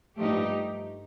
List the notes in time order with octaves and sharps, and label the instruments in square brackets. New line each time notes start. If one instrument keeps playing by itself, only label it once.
[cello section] G2 F3 A3 D#4 G4